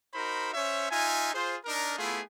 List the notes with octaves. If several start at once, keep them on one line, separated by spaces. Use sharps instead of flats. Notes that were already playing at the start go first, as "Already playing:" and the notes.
D#4 F#4 A#4 C5 B5
C#4 C5 C#5 E5
D#4 F4 E5 G#5
F4 G#4 C5
D4 D#4 A#4
A3 B3 E4 F4 G#4